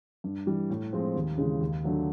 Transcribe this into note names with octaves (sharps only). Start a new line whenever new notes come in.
G2
E3 G3
A2
F3 G#3 C4
D#2
C#3 E3 G#3
D#2
D3 F#3 A3 D4